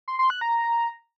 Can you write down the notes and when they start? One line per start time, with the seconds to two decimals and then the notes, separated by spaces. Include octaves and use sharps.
0.08 C6
0.19 C6
0.30 F#6
0.41 A#5